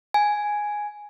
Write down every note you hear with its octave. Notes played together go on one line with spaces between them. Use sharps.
G#5